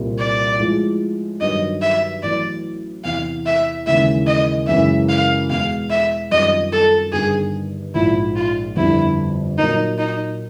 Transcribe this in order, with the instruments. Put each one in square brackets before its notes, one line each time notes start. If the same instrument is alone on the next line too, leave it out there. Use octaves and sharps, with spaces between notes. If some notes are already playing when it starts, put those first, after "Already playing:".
Already playing: [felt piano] C2 A#2 G3 C4
[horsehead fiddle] D5
[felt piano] A2 F3 G#3
[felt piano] G2 D#3 F#3 B3 [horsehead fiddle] D#5
[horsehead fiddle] E5
[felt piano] A1 A2 F#3 B3 [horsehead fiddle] D5
[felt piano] E2 C3 E3 [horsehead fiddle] F5
[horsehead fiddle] E5
[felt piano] D#2 C#3 E3 G#3 [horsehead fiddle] E5
[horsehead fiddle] D#5
[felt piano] F#2 C#3 E3 G#3 B3 [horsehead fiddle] E5
[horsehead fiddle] F5
[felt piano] E2 B2 G#3 [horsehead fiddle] F5
[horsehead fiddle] E5
[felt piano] F#2 D#3 G3 C4 F4 [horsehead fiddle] D#5
[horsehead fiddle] A4
[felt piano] G1 G2 D#3 [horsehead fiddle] G#4
[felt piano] A#1 G#2 F3 [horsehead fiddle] E4
[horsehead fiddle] F4
[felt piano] G1 F2 D3 G3 [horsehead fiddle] E4
[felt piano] A#2 F#3 A#3 [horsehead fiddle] D#4
[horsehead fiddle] D#4